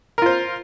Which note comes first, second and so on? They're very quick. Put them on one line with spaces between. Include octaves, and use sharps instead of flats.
A#4 F4 C5